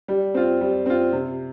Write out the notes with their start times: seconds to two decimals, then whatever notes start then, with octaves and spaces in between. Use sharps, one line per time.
0.08 G3
0.34 C4 F4
0.61 G3
0.86 C4 F4
1.13 C3